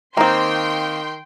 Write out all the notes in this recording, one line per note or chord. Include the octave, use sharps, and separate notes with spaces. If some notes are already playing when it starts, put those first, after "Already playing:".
D#3 A#3 C4 G5 C6